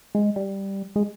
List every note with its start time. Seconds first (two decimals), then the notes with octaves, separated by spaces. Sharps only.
0.15 G#3
0.36 G3
0.96 G#3